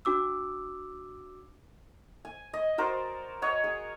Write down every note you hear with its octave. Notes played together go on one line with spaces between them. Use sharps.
D4 F#4 D6 E6
G#5
D#5
F#4 A#4 C5 D5
C#5 D#5 F#5
G#4